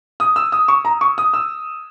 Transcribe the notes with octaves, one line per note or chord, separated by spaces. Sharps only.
D#6
E6
D#6
C#6
A#5
C#6
D#6
E6